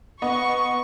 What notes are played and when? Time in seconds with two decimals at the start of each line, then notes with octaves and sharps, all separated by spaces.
0.22 B3 D#5 C#6